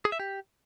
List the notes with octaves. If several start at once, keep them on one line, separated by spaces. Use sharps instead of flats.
G#4
E5
G4